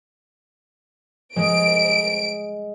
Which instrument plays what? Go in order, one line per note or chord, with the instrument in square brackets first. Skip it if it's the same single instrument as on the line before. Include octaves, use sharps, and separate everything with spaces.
[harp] G#3 [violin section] D7